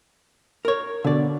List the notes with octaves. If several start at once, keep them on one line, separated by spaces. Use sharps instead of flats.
A#4 C#5
B2 D3 D5